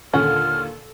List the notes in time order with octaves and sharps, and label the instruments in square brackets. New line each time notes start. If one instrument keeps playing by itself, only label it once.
[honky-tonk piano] D#2 A#2 D3 [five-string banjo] C#4 F#5 [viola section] A4 [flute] F6